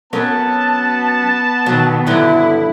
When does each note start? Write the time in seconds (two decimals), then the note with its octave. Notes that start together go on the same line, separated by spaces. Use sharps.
0.13 F#3 B3 C#4 A#4 A5
1.66 B2 D#3 F#3
2.06 G2 D3 F#3 E4